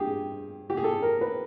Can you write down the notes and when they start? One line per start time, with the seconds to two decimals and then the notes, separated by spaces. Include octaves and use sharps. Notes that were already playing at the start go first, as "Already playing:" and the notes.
Already playing: G2 G4 G#4
0.70 G4
0.77 G#4
0.84 A4
1.02 A#4
1.21 B4